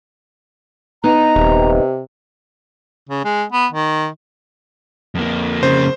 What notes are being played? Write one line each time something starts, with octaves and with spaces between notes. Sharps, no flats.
B3 D#4 A#5
D#1 C3
C#3
G#3
B3
D#3
F2 A#3
C#3 C5